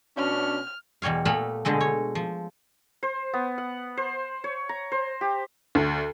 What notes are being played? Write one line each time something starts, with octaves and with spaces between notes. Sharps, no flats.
B2 C#4 D4 F6
E2 B2 G3 C#5 F5
A#2 A3 B3 F5 B5
B2 D3 G#3 A3
C#5
F3
C5
B3
F#5
C5
C#5
A#5
C5
G4
D2